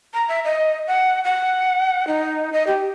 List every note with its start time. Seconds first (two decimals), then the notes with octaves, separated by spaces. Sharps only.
0.14 A#5
0.29 E5
0.44 D#5
0.87 F#5
1.24 F#5
2.07 D#4
2.53 D#5
2.67 G4